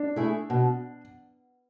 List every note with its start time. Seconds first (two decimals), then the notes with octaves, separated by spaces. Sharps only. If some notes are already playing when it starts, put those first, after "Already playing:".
Already playing: D4
0.16 A3 E4 G#4
0.50 B2